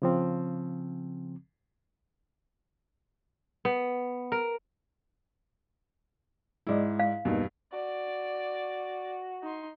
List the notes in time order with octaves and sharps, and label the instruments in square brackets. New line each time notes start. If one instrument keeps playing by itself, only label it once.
[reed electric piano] C#3 F3 C4
[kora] B3
A#4
[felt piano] G#2 E4 [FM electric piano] G#3 D5 D#5
[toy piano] F5
[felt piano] E2 G2 B2 [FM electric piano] A#3 D#4
[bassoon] F#4 [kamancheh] D5
[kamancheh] D#4 C6